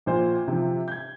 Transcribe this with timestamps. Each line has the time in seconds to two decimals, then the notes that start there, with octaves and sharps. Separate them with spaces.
0.06 A#1 A#2 C5
0.48 C3 F3
0.88 G6 G#6